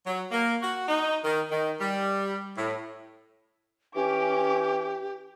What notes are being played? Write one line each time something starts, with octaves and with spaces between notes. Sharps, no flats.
F#3
A#3
F#4
D#4
D#3
D#3
G3
A2
E3 C#4 G4 D6